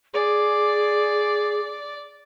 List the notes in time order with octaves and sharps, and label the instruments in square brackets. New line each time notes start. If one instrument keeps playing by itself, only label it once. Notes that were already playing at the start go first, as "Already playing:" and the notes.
[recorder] G#4 [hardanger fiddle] D5